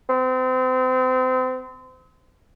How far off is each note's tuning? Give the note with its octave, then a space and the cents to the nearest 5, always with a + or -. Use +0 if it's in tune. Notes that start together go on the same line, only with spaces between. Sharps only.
C4 -30